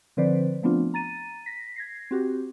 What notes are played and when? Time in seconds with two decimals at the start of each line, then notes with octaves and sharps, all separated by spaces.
0.17 D3 F3 C4 B4 C5 D5
0.63 F3 A3 B3 C4 D4 F4
0.94 A#5 A6 D#7
1.46 A#6 B6
1.76 G#6 A#6 C7
2.11 C4 F#4 G4